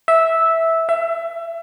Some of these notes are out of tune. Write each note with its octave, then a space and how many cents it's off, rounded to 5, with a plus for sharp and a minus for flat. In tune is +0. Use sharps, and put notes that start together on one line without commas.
E5 -10
E5 +25